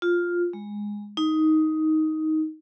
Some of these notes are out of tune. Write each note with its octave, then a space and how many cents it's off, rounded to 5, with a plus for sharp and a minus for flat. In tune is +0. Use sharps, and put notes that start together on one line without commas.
F4 +5
G#3 -10
D#4 +10